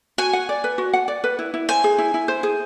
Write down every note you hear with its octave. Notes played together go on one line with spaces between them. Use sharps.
F#4 G#5
F#5
D5
B4
F#4
F#5
D5
B4
E4
E4
C5 G#5
G#4
E4
E4
C5
G#4